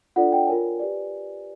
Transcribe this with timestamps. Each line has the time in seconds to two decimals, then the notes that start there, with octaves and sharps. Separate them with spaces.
0.16 D4 F4 A4 D5 F#5
0.32 G5
0.47 F4 A#4 C#5 G#5
0.79 G4 B4 D5